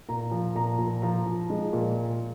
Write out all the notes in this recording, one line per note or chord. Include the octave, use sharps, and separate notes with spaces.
A#2 A#5
F3
A#2 A#5
A#2
F3 A#5
F3
G#3
A#2